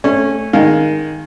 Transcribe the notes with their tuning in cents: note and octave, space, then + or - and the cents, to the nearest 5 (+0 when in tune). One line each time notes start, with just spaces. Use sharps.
A3 +0 C#4 -20 C#6 +0
D#3 +0 G#3 +0 F5 +0